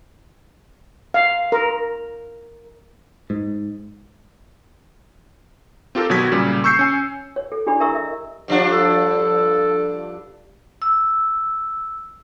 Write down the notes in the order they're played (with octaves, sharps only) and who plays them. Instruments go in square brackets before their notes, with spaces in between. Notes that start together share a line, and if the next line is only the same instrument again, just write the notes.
[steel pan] F5
A#4
[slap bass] G#2
[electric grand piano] C4 F4 G4 A4 A#4
G#1 B2 F#3 F#4 G#6 B6
A#2 C#3 G3
C#6 E6 G6 C7 C#7
C#4 G#5
[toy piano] C#5
A4
D4 E4 G4 G#4 D5 B5
A#4 E5 A#5 C#6 E6
D#5 E5
[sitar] G2 F3 D4
[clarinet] A4
[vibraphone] E6